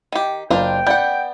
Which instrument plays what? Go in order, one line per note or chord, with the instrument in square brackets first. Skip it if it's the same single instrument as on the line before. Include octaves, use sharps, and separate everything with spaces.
[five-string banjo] D#3 G4
[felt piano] F#1 [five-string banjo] D4 F4 A#4 [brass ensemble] G5
[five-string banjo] B3 F#5 [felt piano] D5 G6